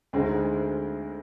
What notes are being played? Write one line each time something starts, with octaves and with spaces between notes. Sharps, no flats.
D2 D3 G#3 C4 D#4